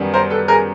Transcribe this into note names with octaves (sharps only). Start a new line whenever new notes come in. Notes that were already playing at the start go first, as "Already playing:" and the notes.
Already playing: F#2 D#3 G3 B3
A#4 C5
A4 B4
G#4 A#4